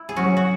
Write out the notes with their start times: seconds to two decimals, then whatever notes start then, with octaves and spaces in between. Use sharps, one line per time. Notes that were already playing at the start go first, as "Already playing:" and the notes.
Already playing: E4
0.09 G#4
0.16 F#3 C#4 F#4
0.37 F#4